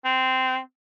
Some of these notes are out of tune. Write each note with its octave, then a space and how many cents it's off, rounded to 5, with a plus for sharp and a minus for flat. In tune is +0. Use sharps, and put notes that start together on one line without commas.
C4 -15